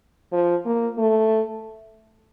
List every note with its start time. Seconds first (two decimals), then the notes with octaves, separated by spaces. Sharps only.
0.32 F3
0.65 A#3
0.98 A3